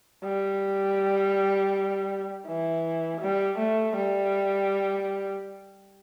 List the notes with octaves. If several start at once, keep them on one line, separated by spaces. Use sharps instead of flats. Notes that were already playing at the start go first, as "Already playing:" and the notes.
G3
E3
G3
A3
G3